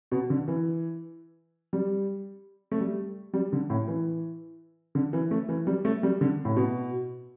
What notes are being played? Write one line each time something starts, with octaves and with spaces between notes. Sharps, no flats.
B2
D3
E3
G3
A3
G3
G3
D3
A2
E3
D3
E3
A3
E3
G3
A3
G3
D3
A2
B2